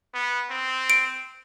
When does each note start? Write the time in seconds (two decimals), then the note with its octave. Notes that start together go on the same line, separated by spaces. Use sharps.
0.14 B3
0.50 C4
0.90 D7